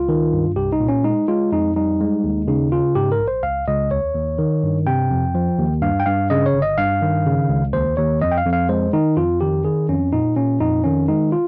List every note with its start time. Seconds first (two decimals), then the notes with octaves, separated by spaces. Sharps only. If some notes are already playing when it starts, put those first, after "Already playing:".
Already playing: C#2 F4
0.09 D#3
0.33 G2
0.56 C2 G4
0.72 D#4
0.80 A#2
0.88 C#4
1.04 G#3 D#4
1.28 G#3 F4
1.52 F2 D#4
1.76 G3 D#4
2.01 G#3
2.24 D#2
2.48 C#3 D#4
2.72 C#3 F4
2.95 G#2 G4
3.12 A#4
3.19 A#1
3.28 C5
3.43 C#2 F5
3.67 C#2 D#5
3.91 D#2 C#5
4.15 D#2
4.38 D#3
4.63 G2
4.87 C3 G5
5.11 F2
5.35 F3
5.59 D#2
5.82 G2 F5
6.00 G5
6.06 G2 F5
6.30 C#3 D#5
6.46 C#5
6.54 G1
6.62 D#5
6.78 G2 F5
7.02 D#3
7.26 C#3
7.49 C#2
7.73 D#2 C5
7.97 D#2 C#5
8.21 F2 D#5
8.31 G5
8.38 F5
8.45 F2
8.53 F5
8.69 G#3 C5
8.93 D#3 D#4
9.17 F2 F4
9.41 D#3 G4
9.65 D#3 G#4
9.89 F2 C#4
10.12 A#2 D#4
10.36 A#2 C#4
10.60 F2 D#4
10.84 D#3 C#4
11.08 G#3 D#4
11.32 F4